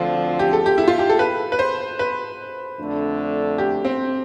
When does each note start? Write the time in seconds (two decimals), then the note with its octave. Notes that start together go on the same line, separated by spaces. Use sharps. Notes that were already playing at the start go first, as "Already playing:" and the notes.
Already playing: D2 D3 F3 C4 F4
0.39 G4
0.53 A4
0.66 G4
0.78 E4
0.88 F4
0.99 G4
1.09 A4
1.19 B4
1.52 B4
1.59 C5
1.99 B4
2.79 F2 D3 A3 D4
3.58 G4
3.85 C4